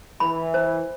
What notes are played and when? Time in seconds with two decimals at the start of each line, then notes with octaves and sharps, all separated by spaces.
0.20 E3 B5
0.54 C5